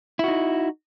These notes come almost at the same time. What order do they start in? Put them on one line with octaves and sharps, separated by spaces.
E4 F#4 D#4